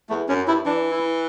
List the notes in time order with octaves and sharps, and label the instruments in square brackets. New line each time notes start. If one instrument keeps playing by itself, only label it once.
[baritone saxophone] E2 [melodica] A3
[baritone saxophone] F#2 [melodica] C#4
[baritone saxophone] G2 [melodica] E4
[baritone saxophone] E3 [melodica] D4
[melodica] E4